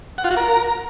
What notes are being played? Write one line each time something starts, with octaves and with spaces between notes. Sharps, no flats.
F#5
F4
F#4
A#4